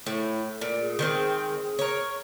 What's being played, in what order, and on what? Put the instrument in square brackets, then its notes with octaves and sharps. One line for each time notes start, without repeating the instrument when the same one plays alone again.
[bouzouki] A2 [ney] E4
[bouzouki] A#2 [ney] D5
[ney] G#4
[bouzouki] D#3 G#3 C4
A#4 C#5